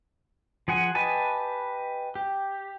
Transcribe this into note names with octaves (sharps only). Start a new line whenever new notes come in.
F3 G#4 F#5 G#5
G4 B4 D#5 G#5 A5
G4